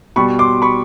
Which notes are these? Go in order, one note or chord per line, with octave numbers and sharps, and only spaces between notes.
B2 G3 B5 C#6
C6 D6
B5 C#6